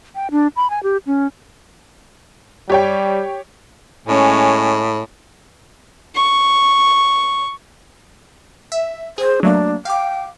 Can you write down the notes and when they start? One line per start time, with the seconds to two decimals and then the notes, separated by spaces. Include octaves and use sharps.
0.15 G5
0.31 D4
0.56 B5
0.70 G#5
0.83 G4
1.06 C#4
2.70 G3 G4 C#5 G5
4.07 A2 G#3 C#4
6.15 C#6
8.72 E5
9.18 G#4 C5
9.43 F#3 A3 A#3 D4
9.85 F5 G5 D6